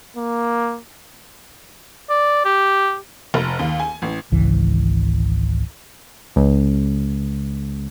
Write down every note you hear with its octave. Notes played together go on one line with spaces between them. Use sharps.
A#3
D5
G4
F1
D#2
G#5
A1
G#1 C#2 E3
C#2